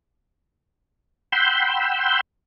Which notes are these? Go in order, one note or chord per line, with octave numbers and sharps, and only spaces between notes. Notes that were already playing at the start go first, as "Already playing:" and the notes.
F#5 G5 B5 C6 E6 G6